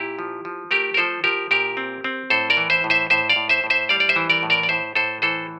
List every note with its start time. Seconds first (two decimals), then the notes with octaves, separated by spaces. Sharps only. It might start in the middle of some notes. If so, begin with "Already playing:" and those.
Already playing: A#2 E4 G4
0.19 F3
0.45 F3
0.71 A3 G4 A#4
0.94 A#4
0.97 F3 A4 C5
1.24 F3 G4 A#4
1.51 A#2 G4 A#4
1.77 C4
2.04 C4
2.30 A2 A4 C5
2.50 A#4 D5
2.57 E3
2.70 C5 E5
2.84 A2
2.90 C5 E5
3.10 A2 C5 E5
3.30 D5 F5
3.36 A2
3.49 C5 E5
3.64 A2
3.70 C5 E5
3.89 G3 D5 F5
4.00 D5
4.09 C5 E5
4.16 E3
4.30 A#4 D5
4.43 A2
4.50 A#4 D5
4.63 D5
4.69 A2 C5 E5
4.95 A2 A4 C5
5.22 E3 A4 C5